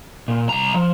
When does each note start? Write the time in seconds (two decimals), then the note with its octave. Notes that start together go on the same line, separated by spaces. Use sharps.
0.28 A#2
0.49 C2 A#5
0.74 F3